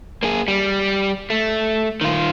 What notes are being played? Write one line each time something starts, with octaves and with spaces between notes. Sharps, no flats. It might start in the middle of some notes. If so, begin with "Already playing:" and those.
A#3 G#4
G3
A3
D#3 F4